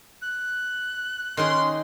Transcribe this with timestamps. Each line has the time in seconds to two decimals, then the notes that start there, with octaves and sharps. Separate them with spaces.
0.21 F#6
1.37 D#3 C#4 G#4 C6